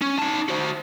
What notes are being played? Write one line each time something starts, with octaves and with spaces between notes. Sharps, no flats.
C#4
D#4 A5
F#4 C5